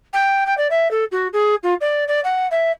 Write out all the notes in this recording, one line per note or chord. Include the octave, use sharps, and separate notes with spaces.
G5
G5
D5
E5
A4
F#4
G#4
F4
D5
D5
F#5
E5